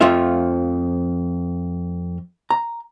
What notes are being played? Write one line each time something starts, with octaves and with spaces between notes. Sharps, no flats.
F2 F3 A3 F4 E5
A#5